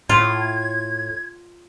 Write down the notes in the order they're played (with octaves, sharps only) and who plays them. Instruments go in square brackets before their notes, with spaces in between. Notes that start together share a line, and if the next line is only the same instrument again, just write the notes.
[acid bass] A2 [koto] F4 [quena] G#6